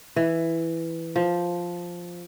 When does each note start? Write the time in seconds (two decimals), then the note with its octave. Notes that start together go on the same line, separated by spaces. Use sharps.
0.16 E3
1.16 F3